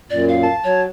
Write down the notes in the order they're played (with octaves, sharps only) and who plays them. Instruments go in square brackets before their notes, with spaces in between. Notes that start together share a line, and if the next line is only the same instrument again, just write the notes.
[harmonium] F#2 A#2 [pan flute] D5
[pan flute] F5
[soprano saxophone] A5
[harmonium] F#3 [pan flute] C#5